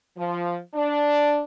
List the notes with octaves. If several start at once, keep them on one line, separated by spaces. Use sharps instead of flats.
F3
D4